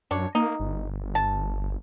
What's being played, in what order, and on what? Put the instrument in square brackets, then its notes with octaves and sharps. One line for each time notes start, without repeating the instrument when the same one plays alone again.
[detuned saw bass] F#2 [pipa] D4 C#5
[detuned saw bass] A#3 [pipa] D#4
[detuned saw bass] G1
[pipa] A5